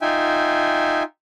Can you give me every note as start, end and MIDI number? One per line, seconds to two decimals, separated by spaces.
0.02 1.03 63
0.02 1.03 65
0.02 1.03 76
0.02 1.03 79
0.02 1.03 80